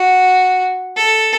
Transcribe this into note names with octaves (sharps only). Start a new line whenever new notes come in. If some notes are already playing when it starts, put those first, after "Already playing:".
Already playing: F#4
A4